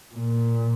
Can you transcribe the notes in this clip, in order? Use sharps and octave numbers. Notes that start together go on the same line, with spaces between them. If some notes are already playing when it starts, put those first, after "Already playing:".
A#2